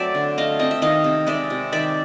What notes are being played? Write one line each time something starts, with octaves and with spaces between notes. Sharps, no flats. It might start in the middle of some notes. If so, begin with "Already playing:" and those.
Already playing: F#3 A3 C4 D5 E5
D3
A3 D#5 F5
C4 D#5
E5
D#3 D#5 F5
C3
G#3 D5 E5
C3
D#3 D5 E5